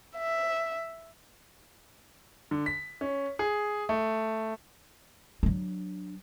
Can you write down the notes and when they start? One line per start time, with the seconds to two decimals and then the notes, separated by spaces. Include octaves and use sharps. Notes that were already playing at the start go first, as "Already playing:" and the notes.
0.17 E5
2.51 D3
2.66 B6
3.01 C#4
3.39 G#4
3.89 A3
5.43 F#3 D4